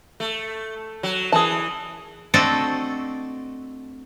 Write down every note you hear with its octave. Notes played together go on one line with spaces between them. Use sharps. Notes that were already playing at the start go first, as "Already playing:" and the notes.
A3
F#3
E3 G#4 A5
A3 C4 D4 F#4 A4 D#5